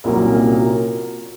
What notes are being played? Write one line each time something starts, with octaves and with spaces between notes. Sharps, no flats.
C2 A#2 F#3 A#3 C#4